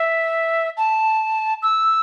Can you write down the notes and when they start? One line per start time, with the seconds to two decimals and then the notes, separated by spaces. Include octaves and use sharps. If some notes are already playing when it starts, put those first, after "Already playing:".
Already playing: E5
0.77 A5
1.62 E6